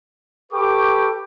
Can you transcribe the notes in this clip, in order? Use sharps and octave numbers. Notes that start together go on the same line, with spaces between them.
G4 A4 B4 G5 C#6 D6